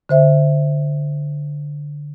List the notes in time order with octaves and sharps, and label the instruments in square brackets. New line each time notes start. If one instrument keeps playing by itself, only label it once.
[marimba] D3 C5 E5